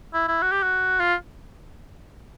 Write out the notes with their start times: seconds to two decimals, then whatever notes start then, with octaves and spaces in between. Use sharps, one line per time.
0.14 E4
0.28 E4
0.42 F#4
0.52 G4
0.63 F#4
1.00 F4